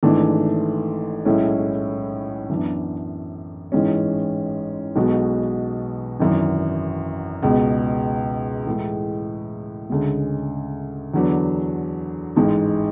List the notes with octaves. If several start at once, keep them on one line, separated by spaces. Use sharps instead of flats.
G#1 G#2 E3 A3 D4
B1 A2 G#3 C#4 E4
F#2 E3 B3 D4
A1 G#2 E3 G#3 C#4
B1 B2 G#3 B3 F#4
G#1 F#2 E3
C#2 B2 G#3 B3
A2 E3 G#3
D2 C#3 G#3
E2 D3 F#3 B3 D4
A1 G#2 G#3